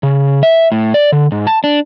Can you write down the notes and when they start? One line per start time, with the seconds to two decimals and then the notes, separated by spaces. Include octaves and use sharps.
0.03 C#3
0.43 E5
0.72 A2
0.94 D5
1.12 D3
1.32 G#2
1.47 A5
1.64 D4